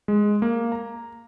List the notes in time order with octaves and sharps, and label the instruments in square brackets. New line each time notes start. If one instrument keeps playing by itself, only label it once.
[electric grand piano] G#3
A#3
A#5